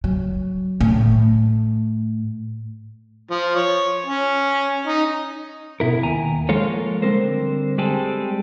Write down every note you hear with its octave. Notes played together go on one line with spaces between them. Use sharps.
F#3
A2
F3
C#5
C#4
D#4
B2 E4 A#4
D#2 G#5 A#5
F3 G#3 A#3 F4 A4 C#5
D3 G3 C4 A4 A#4 C5
G3 G#3 C4 G#4 A4